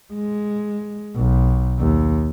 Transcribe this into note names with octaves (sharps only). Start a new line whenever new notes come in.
G#3
B1
D#2